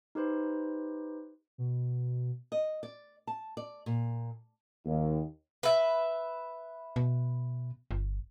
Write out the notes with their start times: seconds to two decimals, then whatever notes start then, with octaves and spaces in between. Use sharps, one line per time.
0.15 D#4 G4 B4 C5
1.58 B2
2.52 D#5
2.83 D5
3.27 A5
3.57 D5
3.86 A#2
4.85 D#2
5.63 B4 E5
6.96 B2
7.91 G1